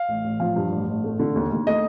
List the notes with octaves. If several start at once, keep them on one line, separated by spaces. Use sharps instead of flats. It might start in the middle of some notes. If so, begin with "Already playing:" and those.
Already playing: F5
A1
A1
F3 F5
G2
A1
A1
A3
D3
D#2
D#2
A3 D#5